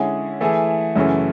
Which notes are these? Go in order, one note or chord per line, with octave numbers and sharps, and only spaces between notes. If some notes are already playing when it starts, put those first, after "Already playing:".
Already playing: D3 G#3 C#4 E4 G#4
E3 A3 E4 G#4
F#2 C#3 E3 A3 C#4